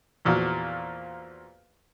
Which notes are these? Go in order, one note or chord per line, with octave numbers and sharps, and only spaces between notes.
E2 A#2 F3 F#4